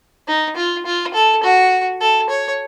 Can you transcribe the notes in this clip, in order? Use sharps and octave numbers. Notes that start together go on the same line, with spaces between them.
D#4
F4
F4
A4
F#4
A4
C#5